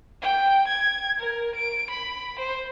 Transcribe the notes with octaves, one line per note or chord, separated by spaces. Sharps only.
G5
G#6
A#4
D7
B5
C5